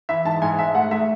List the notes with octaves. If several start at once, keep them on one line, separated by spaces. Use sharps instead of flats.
E3 E5
G#2 A5
G#2 G#5
G#2 E5
A3 F#5
A3 E5